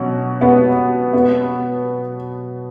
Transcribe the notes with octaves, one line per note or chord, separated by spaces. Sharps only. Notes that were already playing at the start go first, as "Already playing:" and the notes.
Already playing: B2 F#3 C#4 F#4
B3
B3